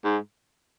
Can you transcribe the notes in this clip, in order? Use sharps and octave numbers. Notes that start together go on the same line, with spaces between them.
G#2